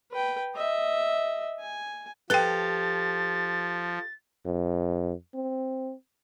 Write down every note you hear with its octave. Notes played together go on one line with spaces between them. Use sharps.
B4 G5
D#5 E5
G#5
F3 G4 A4 B4 G5 A6
F2
C4